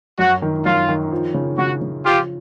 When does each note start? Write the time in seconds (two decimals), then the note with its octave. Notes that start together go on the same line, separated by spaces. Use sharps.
0.19 F#2 F#4
0.42 D#3
0.65 F#2 F4
0.89 D#3
1.12 F3
1.34 C#3
1.58 C#3 F#4
1.81 C#3
2.05 F3 F4 G4